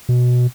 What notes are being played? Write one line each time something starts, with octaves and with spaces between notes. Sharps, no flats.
B2